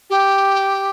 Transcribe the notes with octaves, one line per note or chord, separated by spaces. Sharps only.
G4